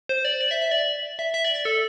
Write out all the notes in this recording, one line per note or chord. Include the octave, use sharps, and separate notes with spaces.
C5
D5
D5
E5
E5
D5
E5
E5
D5
D5
A4